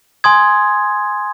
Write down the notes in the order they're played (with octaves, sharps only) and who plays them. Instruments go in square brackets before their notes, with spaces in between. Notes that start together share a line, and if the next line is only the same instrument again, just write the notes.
[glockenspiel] G#5 C6 D#6 G#6